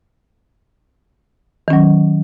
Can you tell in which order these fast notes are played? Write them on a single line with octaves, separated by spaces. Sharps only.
D#3 C#4 F#3